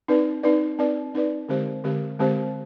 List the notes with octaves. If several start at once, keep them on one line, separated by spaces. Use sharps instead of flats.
C4 D#4 B4 D5
C4 D#4 B4 D5
C4 D#4 B4 D5
C4 D#4 B4 D5
D3 G#3 C4 G4 C5
D3 G#3 C4 G4 C5
D3 G#3 C4 G4 C5